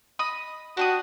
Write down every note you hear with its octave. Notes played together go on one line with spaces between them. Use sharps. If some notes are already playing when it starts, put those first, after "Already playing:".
D#5 B5 D#6
D4 F#4 G4 D#6